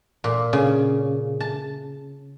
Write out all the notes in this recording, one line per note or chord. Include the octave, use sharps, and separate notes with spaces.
A#2
C#3
A5